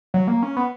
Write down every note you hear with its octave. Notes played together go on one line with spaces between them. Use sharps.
F#3
A#3
C#4
B3